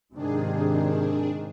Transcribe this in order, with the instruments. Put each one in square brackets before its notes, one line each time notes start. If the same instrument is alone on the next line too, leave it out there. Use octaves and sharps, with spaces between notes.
[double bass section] G#2 C3 D#3 [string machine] D4 G#4